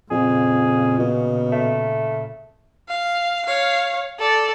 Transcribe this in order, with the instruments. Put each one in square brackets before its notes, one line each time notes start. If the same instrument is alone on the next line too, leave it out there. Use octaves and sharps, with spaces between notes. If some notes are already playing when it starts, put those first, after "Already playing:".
[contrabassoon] F2 [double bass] A#2 C#3 [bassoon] G#4
[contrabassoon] B2
[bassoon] A3
[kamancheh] F5
C#5 F5
A4 D5